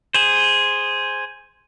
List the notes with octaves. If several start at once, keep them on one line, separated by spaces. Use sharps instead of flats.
G#4 C5